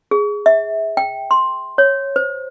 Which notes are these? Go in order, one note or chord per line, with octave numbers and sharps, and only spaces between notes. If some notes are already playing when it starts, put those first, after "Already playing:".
G#4
E5
G5
C6
C#5
C5